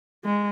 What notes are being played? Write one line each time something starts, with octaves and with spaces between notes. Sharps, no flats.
G#3